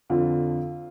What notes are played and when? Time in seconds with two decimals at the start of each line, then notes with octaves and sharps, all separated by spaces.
0.10 F2 D3 F3 F4